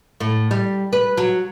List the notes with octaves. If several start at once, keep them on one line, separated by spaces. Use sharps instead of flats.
A2
G3
B4
F#3